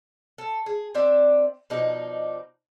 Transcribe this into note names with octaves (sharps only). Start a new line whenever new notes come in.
A4
G#4
C4 D4 D5 E5
B2 F3 D4 D#4